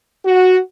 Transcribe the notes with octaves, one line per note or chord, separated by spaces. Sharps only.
F#4